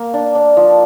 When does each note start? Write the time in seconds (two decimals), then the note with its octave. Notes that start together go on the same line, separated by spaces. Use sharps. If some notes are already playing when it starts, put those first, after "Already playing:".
Already playing: A#3
0.14 D4
0.35 D4
0.57 F3